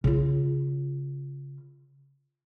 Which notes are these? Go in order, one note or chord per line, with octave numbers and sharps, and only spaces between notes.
C#3 F4